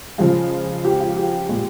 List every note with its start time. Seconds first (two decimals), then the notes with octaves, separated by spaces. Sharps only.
0.18 C#3 F3 G#3 F4
0.85 G4
1.00 F4
1.17 G4
1.49 A#2 G#3